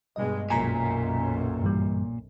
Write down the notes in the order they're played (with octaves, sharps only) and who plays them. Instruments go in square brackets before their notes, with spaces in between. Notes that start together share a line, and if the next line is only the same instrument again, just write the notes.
[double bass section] G2 B2 G#3 [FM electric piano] D#5
[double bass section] B1 F#2 [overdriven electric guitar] A#2 [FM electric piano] G#5 A#5 B6
[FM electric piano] G2 E3 G3